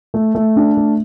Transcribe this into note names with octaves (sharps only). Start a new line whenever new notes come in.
A3
A3
D4
A3